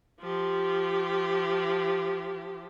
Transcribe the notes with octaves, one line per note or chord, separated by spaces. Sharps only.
F3 G4